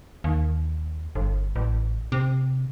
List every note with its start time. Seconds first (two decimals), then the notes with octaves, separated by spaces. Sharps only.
0.24 D#2
1.15 G1
1.56 A1
2.12 C3